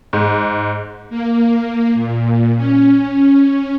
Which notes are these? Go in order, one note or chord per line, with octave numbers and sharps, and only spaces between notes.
G#2
A#3
A#2
C#4